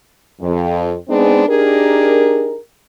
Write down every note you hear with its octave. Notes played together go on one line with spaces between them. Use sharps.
F2
G#3 B3 C4 D4 D#4 G#4
D4 D#4 G4 G#4 A#4